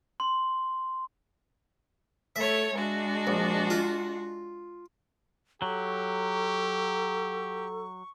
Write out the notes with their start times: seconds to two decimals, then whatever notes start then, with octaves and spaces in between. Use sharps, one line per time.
0.20 C6
2.36 A3 A4 C#5 E5
2.75 G#3 D4 F#4
3.27 A#1
3.70 F4
5.62 F#3 G4 A4 C#6